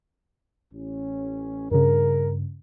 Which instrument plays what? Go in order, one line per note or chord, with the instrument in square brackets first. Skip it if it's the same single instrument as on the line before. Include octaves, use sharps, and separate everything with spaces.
[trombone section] A1 C#4
[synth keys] G2 C#3 [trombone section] A#4